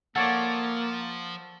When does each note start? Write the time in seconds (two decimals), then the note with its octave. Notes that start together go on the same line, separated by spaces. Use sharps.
0.16 F3 A#3 A4 C#5 D5 F#5